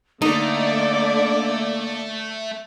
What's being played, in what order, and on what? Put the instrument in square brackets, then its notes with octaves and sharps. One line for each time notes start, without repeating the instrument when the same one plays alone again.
[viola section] D3 D5 [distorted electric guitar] A3 [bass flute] A#3 [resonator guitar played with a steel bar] D#4